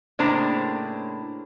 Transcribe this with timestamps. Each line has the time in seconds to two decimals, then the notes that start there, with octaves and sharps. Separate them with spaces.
0.19 A2 C#3 A#3 D4 C5 A#5